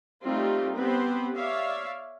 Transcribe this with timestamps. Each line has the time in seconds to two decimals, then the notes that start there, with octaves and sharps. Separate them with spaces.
0.25 G3 A3 C4 D#4 F4 G4
0.76 B3 C4 G4 B4 C5
1.36 C#5 D5 E5 F5